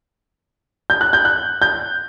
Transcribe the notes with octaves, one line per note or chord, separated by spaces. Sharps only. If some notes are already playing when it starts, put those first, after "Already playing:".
G6
F#6
G6
F#6
G6